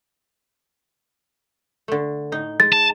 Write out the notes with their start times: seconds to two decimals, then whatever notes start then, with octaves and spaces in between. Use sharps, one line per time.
1.88 D3 A3
2.32 A2 D#4
2.60 G#3 A6
2.73 A5